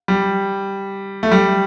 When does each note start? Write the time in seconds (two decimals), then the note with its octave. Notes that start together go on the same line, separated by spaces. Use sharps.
0.08 G3
1.23 A3
1.32 G3